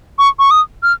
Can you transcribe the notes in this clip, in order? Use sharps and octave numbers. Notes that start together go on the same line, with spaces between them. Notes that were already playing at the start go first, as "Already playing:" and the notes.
C#6
C#6
D#6
F6